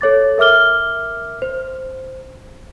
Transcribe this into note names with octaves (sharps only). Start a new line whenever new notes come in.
A4 C#5 D6 A6
A#4 E5 D6 F6 G7
C5